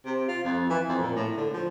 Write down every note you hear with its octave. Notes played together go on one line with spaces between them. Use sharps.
C3
F4
F2
E3
F2
A#2
A2
D3
F3